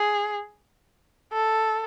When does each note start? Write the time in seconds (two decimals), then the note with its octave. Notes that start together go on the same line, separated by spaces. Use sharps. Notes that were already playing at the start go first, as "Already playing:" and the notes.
Already playing: G#4
1.33 A4